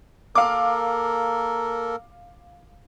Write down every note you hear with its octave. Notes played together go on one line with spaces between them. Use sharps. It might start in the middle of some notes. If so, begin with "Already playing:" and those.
A#3 A4 A#4 F5 D6